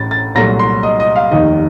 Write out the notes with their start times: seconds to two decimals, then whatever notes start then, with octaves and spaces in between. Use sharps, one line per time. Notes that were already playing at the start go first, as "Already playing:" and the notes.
Already playing: A1 A2 C#4 A6
0.11 A6
0.35 C2 A#2 F#3 A3 A#6
0.59 C6
0.83 D#5
1.00 D#5
1.16 F5
1.32 F1 D#2 D#3 D#5